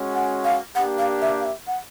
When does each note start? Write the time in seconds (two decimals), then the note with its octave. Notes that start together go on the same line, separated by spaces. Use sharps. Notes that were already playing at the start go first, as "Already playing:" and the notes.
Already playing: G#3 C#4 F#4
0.14 F#5
0.44 F5
0.75 A#3 D4 G4 F#5
0.98 F5
1.22 E5
1.39 F5
1.45 E5
1.67 F#5